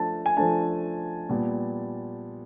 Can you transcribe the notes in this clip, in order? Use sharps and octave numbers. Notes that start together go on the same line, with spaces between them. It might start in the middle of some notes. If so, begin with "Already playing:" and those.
Already playing: F3 A3 D4 A5
G#5
F3 A3 D4 A5
A#2 G3 B3